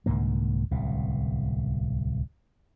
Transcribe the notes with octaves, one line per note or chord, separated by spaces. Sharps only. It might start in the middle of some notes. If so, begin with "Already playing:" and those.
C2 G#2 D3 A#3
D1 C2 B2